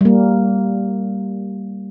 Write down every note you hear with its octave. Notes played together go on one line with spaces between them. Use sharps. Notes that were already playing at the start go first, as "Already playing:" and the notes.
G3 A#3